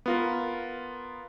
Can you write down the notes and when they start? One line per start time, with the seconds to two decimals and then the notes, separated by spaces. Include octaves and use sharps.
0.06 B3 F4 A#4